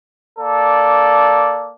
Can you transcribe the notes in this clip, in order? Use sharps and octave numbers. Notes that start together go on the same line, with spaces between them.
A#3 A4 D5